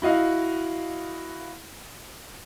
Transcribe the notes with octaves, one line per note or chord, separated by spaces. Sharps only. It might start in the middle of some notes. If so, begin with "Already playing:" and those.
E4 F#4 D#5 F5